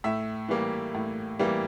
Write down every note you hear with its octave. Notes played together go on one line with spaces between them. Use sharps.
A2 E5
E3 G3 A#3
A2
E3 G3 A#3